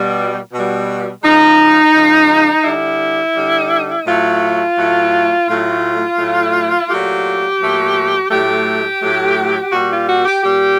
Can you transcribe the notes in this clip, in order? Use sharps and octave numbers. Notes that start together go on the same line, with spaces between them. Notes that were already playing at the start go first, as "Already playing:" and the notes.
Already playing: B2 G3
B2 G3
C#3 F3 G#3 D#4
C#3 F3 G#3
D3 G3 E4
D3 G3
A2 F#3 A3 F4
A2 F#3 A3
A2 F#3 A3 F4
A2 F#3 A3
A#2 F#3 A3 G4
A#2 F#3 A3
A2 F#3 A3 G4
A2 F#3 A3
A#2 G3 F#4
F4
F#4
G4
A#2 G3 G4